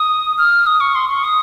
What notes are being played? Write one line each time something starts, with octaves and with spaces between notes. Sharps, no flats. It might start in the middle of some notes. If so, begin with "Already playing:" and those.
Already playing: D#6
F6
D#6
C#6
C6
C#6
D#6